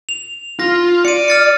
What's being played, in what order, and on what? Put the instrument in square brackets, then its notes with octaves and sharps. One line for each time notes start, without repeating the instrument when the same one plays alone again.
[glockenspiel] F7
[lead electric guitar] F4 [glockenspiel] A#6
[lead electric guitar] D5 [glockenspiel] C#7 D#7
[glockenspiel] F6 A6 C#7